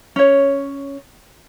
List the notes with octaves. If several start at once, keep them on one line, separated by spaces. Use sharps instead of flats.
C#4 C#5